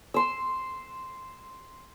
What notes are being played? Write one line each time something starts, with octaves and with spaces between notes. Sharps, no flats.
C6 E6